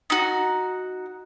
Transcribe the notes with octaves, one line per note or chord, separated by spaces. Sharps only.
D#4 F#4